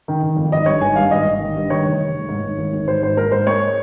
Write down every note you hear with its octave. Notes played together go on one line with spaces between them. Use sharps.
D#3
D#3
F2
G#1 D#5
G2 C#5
G#1 G#5
G2 F5
G#1 D#5
G#1
D#3
G2
D#3 C#5
F1
F1
F1
G#2
G#1
G#1
G#1
G#1 C5
G#2 C5
G#2 A#4
G#2 C5
G#3 C#5